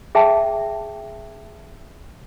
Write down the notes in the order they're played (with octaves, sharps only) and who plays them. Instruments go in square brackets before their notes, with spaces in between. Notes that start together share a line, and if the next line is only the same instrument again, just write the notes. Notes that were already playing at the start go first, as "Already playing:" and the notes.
[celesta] G#4 E5 G5 A5